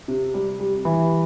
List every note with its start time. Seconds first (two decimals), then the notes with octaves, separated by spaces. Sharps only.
0.08 C3
0.34 G3
0.60 G3
0.85 E3